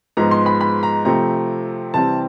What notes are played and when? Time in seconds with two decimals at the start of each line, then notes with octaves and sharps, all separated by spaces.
0.17 G#2 F3 G#3 B3 A#5
0.31 C6
0.46 B5
0.61 B5
0.83 A#5
1.05 C3 F3 A3 C4 A#5
1.94 C3 E3 G3 C4 A5